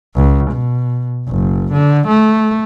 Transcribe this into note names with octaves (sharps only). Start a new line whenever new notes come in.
C#2
B2
F#1
D3
A3